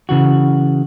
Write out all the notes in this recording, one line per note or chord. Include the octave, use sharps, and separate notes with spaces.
C#3 E3 F#4